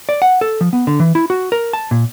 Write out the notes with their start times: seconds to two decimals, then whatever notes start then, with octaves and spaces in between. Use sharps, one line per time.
0.09 D5
0.22 F#5
0.41 A4
0.61 F3
0.73 B3
0.87 D3
1.00 E3
1.15 E4
1.30 F#4
1.52 A#4
1.73 A5
1.91 A#2